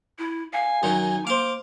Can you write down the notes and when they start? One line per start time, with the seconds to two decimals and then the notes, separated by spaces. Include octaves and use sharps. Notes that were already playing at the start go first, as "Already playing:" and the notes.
0.19 E4
0.53 F5 G#5
0.83 F#2 D#3 F#3 D#4
1.27 A#3 C5 F5 D6